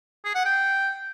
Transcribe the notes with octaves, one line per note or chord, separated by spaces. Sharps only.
G#4
F#5
G5